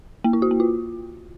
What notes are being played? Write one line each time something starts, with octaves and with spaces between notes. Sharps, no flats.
A#3
E4
F#4
A#3
F4